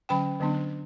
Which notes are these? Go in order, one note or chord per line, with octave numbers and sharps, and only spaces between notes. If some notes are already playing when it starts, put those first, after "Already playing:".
D3 F#3 C#4 G5 B5
D3 F#3 B3 D4